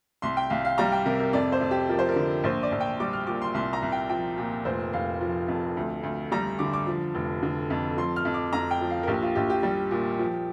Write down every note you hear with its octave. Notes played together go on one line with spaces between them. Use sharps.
C2 C6
G5
C2 F5
F5
G3 A#5
G5
C3 A#4
A#4
F2 D5
C5
F2
G4
F3 A#4
C5
A#4
D3
A#1 C5
D5
A#1
G5
G3 D6
F6
A#2 D6
C6
C2 C6
A#5
C2
G5
F3 G5
A#2
F1 C5
F1 F5
F3
F2
D2
D2
G3 A#5
D3 D6
D6
F3
F1
D3
F2
F3 C6
F6
F2
D6
F2 A#5
G5
F3
F5
A#4
A#1 G4
F4
A#1 G4
G4
G3
A#2
F3